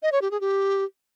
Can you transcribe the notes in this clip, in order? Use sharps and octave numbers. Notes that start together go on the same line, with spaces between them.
D#5
C#5
G4
G#4
G4